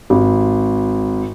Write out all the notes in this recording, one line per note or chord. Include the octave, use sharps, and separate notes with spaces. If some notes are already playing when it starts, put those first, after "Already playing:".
G#1